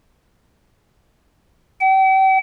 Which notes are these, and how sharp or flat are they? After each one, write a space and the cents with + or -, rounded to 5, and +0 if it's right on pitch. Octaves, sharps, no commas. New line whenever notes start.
G5 -40